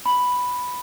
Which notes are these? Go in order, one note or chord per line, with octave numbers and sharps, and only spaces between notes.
B5